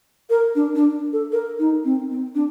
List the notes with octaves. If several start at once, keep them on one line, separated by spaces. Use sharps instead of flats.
A#4
D4
D4
A4
A#4
D#4
C4
C4
D4